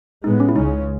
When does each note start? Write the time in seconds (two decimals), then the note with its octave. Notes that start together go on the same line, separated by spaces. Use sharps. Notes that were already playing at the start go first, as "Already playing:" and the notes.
0.24 A2 G#3 B3 D#4
0.40 C#4
0.49 E4
0.56 C#2 C#3 G#3 C#4 D#4